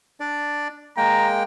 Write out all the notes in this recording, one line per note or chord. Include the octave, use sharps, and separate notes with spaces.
D4 D5
G#3 A#3 G5 A#5